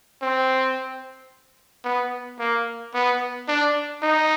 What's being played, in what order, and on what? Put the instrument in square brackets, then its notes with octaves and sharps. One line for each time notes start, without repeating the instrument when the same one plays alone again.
[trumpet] C4
B3
A#3
B3
D4
D#4